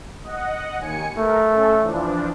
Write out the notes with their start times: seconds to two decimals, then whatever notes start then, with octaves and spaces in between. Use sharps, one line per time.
0.23 D#5 F#5
0.78 D#2 G#5 C#7
1.17 A3 A#4
1.50 C#4 A4
1.82 E3 F3 D4